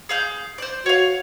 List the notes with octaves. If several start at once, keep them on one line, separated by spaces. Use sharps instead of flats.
G#4 F5 G6
C5 D5
F#4 C#5 F5